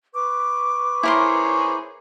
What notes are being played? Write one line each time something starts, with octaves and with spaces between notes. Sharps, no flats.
B4 C#6 D6
E4 G#4 A#4 C5 C#5 C6